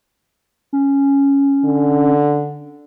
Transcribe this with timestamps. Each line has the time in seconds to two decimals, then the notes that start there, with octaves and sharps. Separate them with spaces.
0.73 C#4
1.65 D3